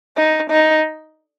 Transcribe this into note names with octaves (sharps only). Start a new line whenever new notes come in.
D#4
D#4